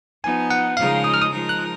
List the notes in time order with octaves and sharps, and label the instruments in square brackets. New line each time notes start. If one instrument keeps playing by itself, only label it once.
[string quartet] F3 B3 D#4 [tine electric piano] G#5
[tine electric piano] F#5
[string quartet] C#3 F3 G#3 D#4 A#4 [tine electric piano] F5
[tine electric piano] D#6
F6
D#6
[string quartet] F3 G#3 D#4 A#4
[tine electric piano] F#6